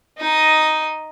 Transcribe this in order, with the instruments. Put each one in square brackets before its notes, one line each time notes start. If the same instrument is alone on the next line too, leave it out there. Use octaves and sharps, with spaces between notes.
[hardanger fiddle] D#4 D#5